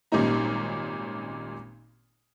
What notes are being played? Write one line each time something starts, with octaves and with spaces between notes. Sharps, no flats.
G#1 A#2 G3 C#4 D#4 A#5